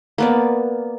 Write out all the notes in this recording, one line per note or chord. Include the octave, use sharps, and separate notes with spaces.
A#3 B3 D5